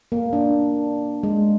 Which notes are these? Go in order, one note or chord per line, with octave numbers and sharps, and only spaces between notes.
A#3
D4
G#3